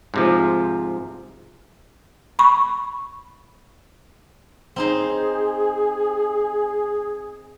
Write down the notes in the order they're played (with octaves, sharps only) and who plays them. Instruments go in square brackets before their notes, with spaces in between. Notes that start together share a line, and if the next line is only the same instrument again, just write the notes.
[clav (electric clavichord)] G#2 C3 F3
[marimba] B5 C#6
[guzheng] C4 D#4 C5 [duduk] G#4